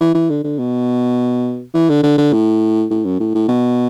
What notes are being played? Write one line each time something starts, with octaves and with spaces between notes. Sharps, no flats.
E3
E3
D3
D3
B2
E3
D3
D3
D3
A2
A2
F#2
A2
A2
B2